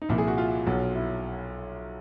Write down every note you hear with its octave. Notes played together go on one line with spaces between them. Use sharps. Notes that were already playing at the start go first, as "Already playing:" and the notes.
D#4
C2 A#2 F3 E4
G#4
F#4
F4
B1 B2 F#3
E4